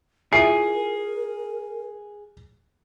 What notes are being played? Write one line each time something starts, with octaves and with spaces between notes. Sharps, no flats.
E4 F4 G#4 A#4 E5 C7